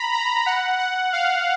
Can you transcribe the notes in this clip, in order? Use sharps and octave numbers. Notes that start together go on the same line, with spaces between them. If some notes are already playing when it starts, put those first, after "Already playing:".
Already playing: A#5 B5
A#5
F#5
F#5
F5